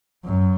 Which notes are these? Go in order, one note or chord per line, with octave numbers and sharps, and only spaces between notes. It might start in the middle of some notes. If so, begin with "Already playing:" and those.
F#2